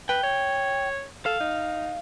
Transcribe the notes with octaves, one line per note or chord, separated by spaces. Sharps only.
B4 G5
C#5
A4 F5
D#4